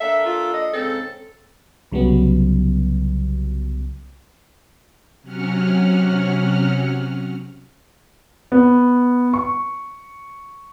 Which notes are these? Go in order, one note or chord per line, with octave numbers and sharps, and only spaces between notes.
A#3 D4 A4 E5
F4
D#5
G#2 C#3 C4 A4
C2 C#3 F#3 G3 B3
C3 F#3 C#4 F#5 F6
B3
C#6